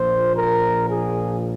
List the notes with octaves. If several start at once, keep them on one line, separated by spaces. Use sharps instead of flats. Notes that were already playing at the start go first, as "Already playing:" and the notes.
Already playing: A#1 A#2 F3 C5
A#4
G#4